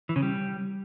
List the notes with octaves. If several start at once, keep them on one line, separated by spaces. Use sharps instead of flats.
E3
C#3
G3